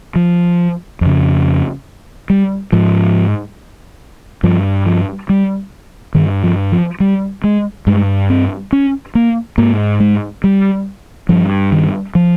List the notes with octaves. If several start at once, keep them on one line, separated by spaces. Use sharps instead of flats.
F3
F2 C#3
G3
G#2 F3
G2 F3
F3
G3
G2 D#3
F3
F3
G3
G#3
G2 G#3
C4
C#4
A#3
G#2 A#3
G#3
G3
G2 F3
D#3
F3